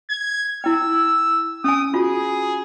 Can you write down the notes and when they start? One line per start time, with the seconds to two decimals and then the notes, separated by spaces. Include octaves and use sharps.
0.10 G#6
0.64 E4 G5 E6
1.64 C#4 G#5 D#6
1.94 F4 F#4 G#4